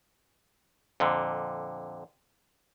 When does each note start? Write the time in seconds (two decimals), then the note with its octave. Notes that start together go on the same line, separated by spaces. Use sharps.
1.00 F2 A#2 D3